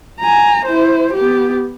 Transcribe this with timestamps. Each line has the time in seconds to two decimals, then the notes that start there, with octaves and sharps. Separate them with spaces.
0.20 G#5 A#5
0.66 E4 C5
1.14 B3 G4